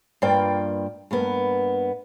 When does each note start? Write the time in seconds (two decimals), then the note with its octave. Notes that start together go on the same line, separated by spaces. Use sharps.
0.22 G2 A#3 F4 D5 G5
1.11 G2 A#3 B3